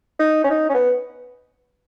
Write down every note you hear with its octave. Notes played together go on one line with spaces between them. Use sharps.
D#4
C#4
D#4
C#4
B3